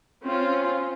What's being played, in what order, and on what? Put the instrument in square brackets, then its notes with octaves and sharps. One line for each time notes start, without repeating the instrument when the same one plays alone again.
[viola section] C4 C#4 F4